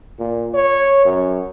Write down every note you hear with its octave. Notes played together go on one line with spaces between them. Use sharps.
A#2
C#5
F#2